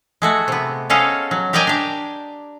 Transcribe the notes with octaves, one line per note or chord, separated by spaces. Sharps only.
G#3 A3 F#4
C3 B3
G#3 B3 C#4 A4 D#5 F5
F#3
G4 A#4 D5 D#5 G5 G#5
D4 G4